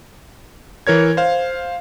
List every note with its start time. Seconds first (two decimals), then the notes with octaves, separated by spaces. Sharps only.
0.87 E3 A#4 C#5 G#6
1.17 C5 F5